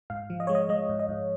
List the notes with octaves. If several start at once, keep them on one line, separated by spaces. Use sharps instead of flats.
G#2 F5
F3
D#5
G#3 C#5
D#5
G#3 D#5
G#2
D#5
G#2